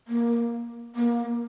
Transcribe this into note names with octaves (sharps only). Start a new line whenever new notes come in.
A#3
A#3